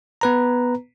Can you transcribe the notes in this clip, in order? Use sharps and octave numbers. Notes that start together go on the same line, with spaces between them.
B3 B4 A#5